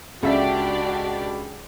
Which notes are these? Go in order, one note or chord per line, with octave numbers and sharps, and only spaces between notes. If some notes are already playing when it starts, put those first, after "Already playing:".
C#2 D4 F#4 G4 A4 D5 E5